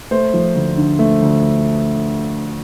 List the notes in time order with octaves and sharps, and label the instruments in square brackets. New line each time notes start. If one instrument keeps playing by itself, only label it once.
[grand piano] A3 C5
F3
D2
D3
A3
D2